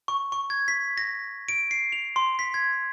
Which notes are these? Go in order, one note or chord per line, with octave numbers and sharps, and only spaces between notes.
C#6
C#6
G#6
B6
A#6
D7
C7
F7
C6
B6
G#6